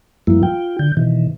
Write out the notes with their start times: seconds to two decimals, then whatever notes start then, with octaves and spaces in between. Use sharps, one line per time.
0.27 F#2 F3 G3 A#3 E4
0.43 F4 G5
0.79 D3 G6
0.97 B2 D#3 E3